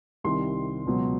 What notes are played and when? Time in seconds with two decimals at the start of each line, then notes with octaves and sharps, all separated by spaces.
0.24 C2 C3 D#3 G3 C6
0.86 C#2 B2 F#3